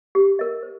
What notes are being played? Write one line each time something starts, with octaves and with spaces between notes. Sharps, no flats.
G4
A#4 D#5
C5